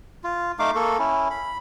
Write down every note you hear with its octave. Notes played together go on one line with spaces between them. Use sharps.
F4
A3 D#4 F5 D6
A#3 A4 C#6
C#4 E4
B5